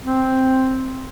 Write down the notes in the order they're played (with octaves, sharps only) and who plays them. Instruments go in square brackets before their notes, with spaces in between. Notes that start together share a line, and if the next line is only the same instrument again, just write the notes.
[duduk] C4